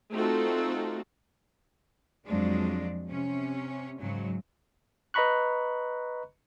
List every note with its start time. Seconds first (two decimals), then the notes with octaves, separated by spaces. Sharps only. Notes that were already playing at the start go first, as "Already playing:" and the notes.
0.13 A3 C4 D#4 F4 F#4 A4
2.27 F2 F3 F#3 G#3 D4
3.10 C3 C#4
4.00 G#2 C#3 F#3
5.14 B4 D#5 A#5 B5 C#6 F#6